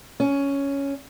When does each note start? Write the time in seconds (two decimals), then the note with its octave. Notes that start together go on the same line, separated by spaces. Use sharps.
0.20 C#4